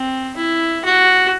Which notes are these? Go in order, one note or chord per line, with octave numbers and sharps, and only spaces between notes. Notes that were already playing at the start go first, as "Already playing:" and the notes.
Already playing: C4
E4
F#4